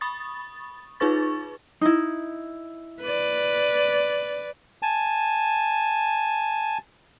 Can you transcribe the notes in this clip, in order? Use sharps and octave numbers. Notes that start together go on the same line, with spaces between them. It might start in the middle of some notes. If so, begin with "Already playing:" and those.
B5 C#6 D#6 A6
D#4 F4 G#4 B4 C#6 A6
D#4 E4
B4 D5
G#5 A5